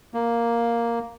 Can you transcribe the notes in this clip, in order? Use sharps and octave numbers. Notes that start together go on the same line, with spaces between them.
A#3